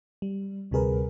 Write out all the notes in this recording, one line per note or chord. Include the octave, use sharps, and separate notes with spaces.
G3
D2 C3 G3 G#4 A#4 B4